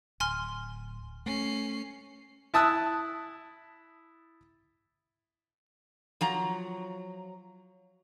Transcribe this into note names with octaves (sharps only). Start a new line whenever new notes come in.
D1 G#5 C6 F6
A3 C#4 C7
E4 A5 D#6 E6 F#6
F3 F#3 A#5